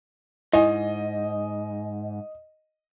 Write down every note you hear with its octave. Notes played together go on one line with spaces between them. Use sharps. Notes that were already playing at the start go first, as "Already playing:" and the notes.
G#2 E4 D#5 G#5